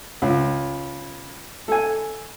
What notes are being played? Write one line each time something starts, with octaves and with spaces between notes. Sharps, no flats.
C#2
A4 G#5